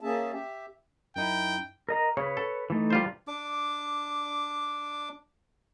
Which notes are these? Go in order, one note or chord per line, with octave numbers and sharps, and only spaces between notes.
A#3 C#4 G#4 E5 A5
G4 E5
F#2 D#4 E4 G5
A#4 D#5 A#5
C#3 B4 C#5
A4
E3 A3 D#4
G3 F4 C5
D4 D6